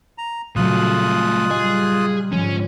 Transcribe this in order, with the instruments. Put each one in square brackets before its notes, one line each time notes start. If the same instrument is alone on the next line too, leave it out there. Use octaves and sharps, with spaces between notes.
[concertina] A#5
[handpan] A#2 C#3 F#3 [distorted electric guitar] G3 A3 [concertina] F4 D#6 F#6
[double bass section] G3 [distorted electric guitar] G#4 [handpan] D#5
[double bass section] G#2 D3 G#3 [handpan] F3 [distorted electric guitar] C#4